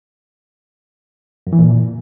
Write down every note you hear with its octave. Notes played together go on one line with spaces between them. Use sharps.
F#2
E3
A#2